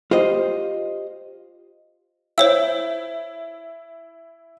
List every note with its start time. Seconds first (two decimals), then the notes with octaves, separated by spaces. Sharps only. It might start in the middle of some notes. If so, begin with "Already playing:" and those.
0.11 F4 G4 C5 D#5
2.38 E4 C5 C#5 E6